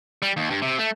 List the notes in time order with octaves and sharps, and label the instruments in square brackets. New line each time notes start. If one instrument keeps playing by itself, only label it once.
[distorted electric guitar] G3
D#2
G2
C3
A3